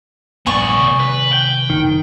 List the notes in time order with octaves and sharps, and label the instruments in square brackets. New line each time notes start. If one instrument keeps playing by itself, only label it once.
[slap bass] A#1 G2 G3 [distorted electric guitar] B3 D5 [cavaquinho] G#5 C#6
[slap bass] C3 D#3 A3
[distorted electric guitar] B4
G5
[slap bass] F#1 [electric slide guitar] D#3